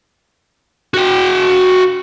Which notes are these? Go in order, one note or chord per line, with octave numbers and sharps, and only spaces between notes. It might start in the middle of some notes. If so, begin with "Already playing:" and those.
F#4 G5